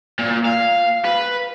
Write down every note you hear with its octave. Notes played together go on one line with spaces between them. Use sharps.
A#2
F5
B4